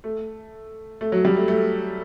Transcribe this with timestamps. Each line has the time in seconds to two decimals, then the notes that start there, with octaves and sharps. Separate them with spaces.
0.04 A3
1.01 A3
1.12 F#3
1.25 G3
1.36 A3
1.48 A3